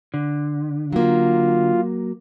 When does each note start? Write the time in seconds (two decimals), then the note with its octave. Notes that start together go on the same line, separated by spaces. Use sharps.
0.14 D3
0.93 F#3 A#3 F4